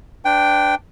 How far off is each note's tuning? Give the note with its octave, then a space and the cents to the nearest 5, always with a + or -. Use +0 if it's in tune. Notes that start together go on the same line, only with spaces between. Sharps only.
D4 +0 B4 +30 G5 +0